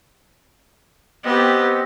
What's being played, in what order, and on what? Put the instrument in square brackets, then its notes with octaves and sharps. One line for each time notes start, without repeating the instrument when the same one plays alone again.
[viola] B3 G4 [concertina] C4 D#5